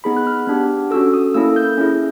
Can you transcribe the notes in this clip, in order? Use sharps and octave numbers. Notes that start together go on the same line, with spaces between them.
B3 D#4 G#4 B5
F#6
F6
B3 D4 G4
C#4 F#4 A4 E6
D#6
A#3 C#4 E4 A4 E6
G6
C#4 E4 G#4